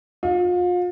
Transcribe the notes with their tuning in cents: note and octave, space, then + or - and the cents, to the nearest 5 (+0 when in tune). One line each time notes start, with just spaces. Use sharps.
F4 +35